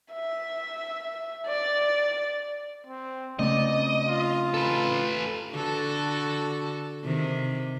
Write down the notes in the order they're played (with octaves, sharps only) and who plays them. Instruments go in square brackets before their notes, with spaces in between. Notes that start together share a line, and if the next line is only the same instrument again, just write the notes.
[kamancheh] E5
D5
[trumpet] C4
[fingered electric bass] C#3 A3 C4 [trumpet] D5 [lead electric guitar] D#5
[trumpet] F4
[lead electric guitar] A4 B4
[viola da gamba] D3 F#4 A4
C3 D#3